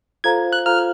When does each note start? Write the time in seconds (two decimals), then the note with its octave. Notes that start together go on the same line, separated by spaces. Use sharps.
0.24 F4 A4 C5 F5 A#5 G#6
0.53 F#6
0.66 F4 A4 C5 F5 A#5 F6